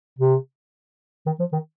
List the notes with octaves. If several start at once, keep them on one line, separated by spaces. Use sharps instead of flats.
C3
D#3
F3
D#3